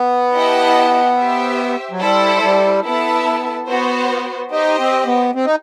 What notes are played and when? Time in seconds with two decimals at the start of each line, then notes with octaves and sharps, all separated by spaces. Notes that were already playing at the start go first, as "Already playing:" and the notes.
Already playing: B3
0.34 E4 G4 D#5 F#5 A5
1.17 G4 C5 E5
1.91 F#3
2.01 G3 E4 A4 C5
2.43 G3
2.84 B3 E4 A4 E5 A5
3.67 B3 F#4 C5
4.51 D#4 G4 C5 D#5
4.79 C4
5.06 B3
5.35 C4
5.45 D#4